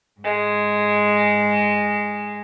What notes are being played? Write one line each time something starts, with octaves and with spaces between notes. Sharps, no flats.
G#2 G#3